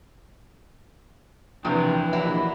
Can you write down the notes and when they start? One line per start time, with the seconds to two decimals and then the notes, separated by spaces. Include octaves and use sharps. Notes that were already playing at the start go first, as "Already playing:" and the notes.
1.65 E2 C3 E3 F3 D4 F4 B4 G5
2.13 A#1 D#2 D3 F#3 E4